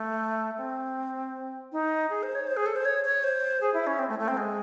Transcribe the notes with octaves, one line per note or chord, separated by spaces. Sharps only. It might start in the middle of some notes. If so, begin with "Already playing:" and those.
Already playing: A3
C4
D#4
G#4
C5
C#5
C5
G#4
A4
C5
C#5
C#5
C5
G#4
E4
C#4
C4
A3
A3
C4
G#3